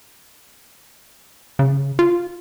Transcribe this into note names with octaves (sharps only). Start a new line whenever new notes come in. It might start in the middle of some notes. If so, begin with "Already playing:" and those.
C#3
F4